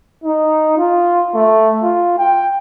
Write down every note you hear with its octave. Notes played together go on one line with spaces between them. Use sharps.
D#4
F4
A3
F4
G5